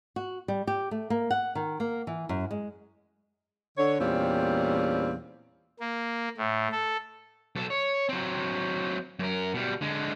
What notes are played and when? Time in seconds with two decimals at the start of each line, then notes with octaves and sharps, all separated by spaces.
0.16 F#4
0.48 G3
0.67 G4
0.91 A3
1.10 A#3
1.31 F#5
1.55 D#3
1.80 A#3
2.07 E3
2.29 F#2
2.51 G#3
3.78 D3 C#5
3.99 E2 A#2 G3 C4 C#4 F5
5.80 A#3
6.37 A2
6.72 A4
7.55 B1 A4
7.70 C#5
8.09 F#3 C4
9.19 F#2 A#4
9.54 B2 G3
9.81 D3 G#3